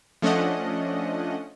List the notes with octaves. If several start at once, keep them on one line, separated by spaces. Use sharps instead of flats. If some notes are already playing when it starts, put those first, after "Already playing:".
F3 A3 C#4 D4 D#5 F#5